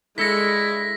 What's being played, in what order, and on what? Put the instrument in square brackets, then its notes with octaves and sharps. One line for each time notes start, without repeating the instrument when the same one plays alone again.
[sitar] G2 A4 [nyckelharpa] G#3 [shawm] E4 [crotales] A#6 B6